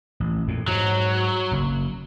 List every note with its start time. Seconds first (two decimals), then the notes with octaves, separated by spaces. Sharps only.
0.20 A1
0.48 F2 A#2
0.68 G#2 F#3
1.51 F#1 F#2